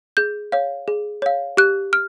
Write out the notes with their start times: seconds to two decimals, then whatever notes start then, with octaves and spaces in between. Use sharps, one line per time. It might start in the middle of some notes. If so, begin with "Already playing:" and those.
0.17 G#4 G6
0.52 C#5 F5
0.88 G#4
1.22 C#5 F5
1.57 G4 F#6
1.93 F6